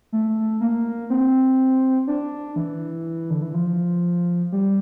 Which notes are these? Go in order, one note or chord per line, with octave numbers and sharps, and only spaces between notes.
A3
A#3
C4
D4
E3
D3
E3
F3
G3